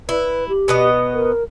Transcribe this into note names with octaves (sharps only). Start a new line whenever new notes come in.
E4 B4
G4
B2 B3 D#5
A#4